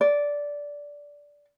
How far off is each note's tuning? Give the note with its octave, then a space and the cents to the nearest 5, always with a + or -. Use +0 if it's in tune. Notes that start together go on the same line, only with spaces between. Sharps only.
D5 -10